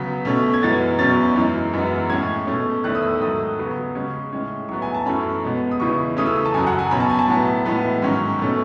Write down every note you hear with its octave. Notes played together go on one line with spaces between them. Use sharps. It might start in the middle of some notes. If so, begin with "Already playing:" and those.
Already playing: C#3 F#3 B3 B6
B2 A3 C#4
G#6
F#2 E3 G#3 B3 A6
E2 B2 F#3 C#4 A6
F#2 E3 G#3
F#2 E3 G#3 B3
A2 G#3 C#4 G#6
B2 A3 C#4
E2 D#3 A3 F#6
D#6
E6
G#2 D#3 F#3 A3 D#6
C#3 F#3 B3
C#3 G#3 C#4
A2 G#3 C#4
A2 F#3 B3 C#6
G#5
A5
F#2 E3 A3 C#4 B5
B2 G#3 B3
D#6
E2 C#3 E3 G#3 C#6
C#3 E3 A3 C#4 D#6
E6
D#6
A5
F#2 C#3 F#3 G#5
F#5
G#5
B2 F#3 C#4 B5
A5
G#5
A5
A2 F#3 B3
A2 E3 G#3 B3
G#2 D#3 F#3 C#4
B2 A3 C#4